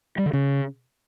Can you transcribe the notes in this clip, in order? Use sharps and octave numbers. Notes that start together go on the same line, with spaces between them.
G3
D3
C#3